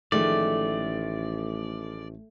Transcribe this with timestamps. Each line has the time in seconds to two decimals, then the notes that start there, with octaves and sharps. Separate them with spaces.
0.12 A1 D#3 F3 G#3 A3 D5